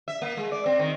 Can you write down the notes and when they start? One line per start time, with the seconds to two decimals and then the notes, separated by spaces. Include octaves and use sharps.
0.08 E5
0.22 A#3
0.37 G#3
0.52 D5
0.66 C4
0.79 D#3